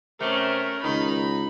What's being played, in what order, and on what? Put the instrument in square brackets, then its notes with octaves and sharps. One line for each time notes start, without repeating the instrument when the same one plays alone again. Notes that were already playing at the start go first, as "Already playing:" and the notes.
[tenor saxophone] C3 [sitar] A3 [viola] C#4 A#4
[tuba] C#2 [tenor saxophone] D#3 [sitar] D#4 [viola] B5